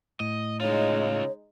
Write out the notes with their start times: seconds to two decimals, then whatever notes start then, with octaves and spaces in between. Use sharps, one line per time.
0.20 A2 D#5
0.61 C#3 G#3 D#4 F4 C#5